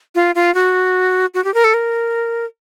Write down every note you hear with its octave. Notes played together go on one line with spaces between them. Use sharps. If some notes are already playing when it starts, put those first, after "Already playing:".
F4
F4
F#4
F#4
G4
A#4
A4
A#4